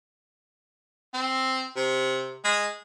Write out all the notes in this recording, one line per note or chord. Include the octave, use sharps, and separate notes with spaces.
C4
C3
G#3